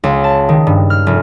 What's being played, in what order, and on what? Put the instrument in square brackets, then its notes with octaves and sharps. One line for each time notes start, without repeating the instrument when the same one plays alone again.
[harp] C#2
A5
D#3
G2
F6
F1